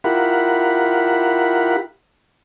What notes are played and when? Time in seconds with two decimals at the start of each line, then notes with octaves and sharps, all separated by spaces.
0.04 E4 F4 G4 A#4 F#5 B5